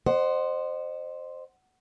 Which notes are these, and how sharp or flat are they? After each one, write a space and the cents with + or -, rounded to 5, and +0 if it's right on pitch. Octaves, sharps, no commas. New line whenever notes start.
C5 +0 D#5 -35 F#5 +15